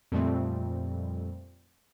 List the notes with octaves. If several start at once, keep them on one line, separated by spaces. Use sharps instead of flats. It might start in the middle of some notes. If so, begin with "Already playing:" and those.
F2 A#2 F3 G3 A3 C4